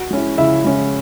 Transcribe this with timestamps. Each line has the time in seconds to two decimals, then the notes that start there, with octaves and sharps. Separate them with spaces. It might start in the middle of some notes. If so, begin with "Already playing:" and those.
Already playing: F#4
0.11 G#3 C#4 E4
0.38 C#3 E4 E5
0.65 G#3 C#4 E4